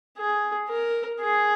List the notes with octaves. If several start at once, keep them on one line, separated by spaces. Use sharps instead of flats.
G#4
A#4
G#4